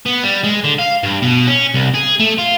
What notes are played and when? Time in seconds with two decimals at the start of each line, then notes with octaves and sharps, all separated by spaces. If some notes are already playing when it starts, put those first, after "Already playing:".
0.06 B3
0.23 G3
0.44 G#3
0.64 D3
0.78 F5
1.03 G2
1.22 B2
1.47 C#4
1.74 C2
1.94 G#4
2.19 A3
2.38 F4